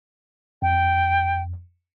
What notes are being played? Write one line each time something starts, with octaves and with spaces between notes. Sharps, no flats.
F2 G5